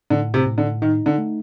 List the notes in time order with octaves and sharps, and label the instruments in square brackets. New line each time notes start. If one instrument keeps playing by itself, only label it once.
[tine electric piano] A2 [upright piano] D3
[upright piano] C3
[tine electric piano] A2
[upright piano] D3
[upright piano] D#3 [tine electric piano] D#4
[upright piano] D3
[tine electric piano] A3